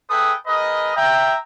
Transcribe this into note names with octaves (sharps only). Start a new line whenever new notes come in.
A3 G#4 A4 B4 G5 D#6
G#4 A#4 B4 D#5
E5 G5 A#5